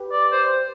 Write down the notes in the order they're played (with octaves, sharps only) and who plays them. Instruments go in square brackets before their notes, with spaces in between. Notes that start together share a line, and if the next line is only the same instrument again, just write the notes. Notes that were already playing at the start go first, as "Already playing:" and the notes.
Already playing: [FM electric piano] G4 B4
[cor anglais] D5
C5